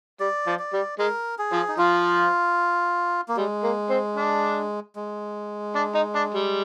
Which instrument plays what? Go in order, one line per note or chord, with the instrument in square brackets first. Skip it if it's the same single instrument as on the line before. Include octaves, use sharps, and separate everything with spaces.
[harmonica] G3 [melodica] D5
[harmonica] F3
[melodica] D5
[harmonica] G3
[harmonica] G#3 [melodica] A#4
[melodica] G#4
[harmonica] F3
[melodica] D#4
[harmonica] F3 [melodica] F4
[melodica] A#3
[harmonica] G3 [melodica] G#3
[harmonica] A#3
C4
D4
[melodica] G#3
[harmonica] D4
D#4
D4
G3